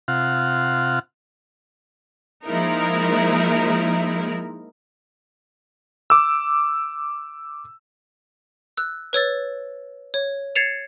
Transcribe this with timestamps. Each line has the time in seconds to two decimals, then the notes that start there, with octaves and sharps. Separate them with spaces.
0.08 C3 F4 F5 F#5
2.47 F3 G#3 A#3 D#4 E4 A#4
6.10 D6 E6
8.77 E6 F#6
9.13 B4 C#5 E6 A6
10.14 C#5
10.55 G#6 A6 C7 C#7 E7 F7